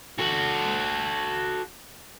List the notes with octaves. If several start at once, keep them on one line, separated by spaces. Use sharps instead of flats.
F#4 A4